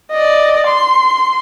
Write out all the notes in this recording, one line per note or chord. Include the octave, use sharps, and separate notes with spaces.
D5 D#5
C6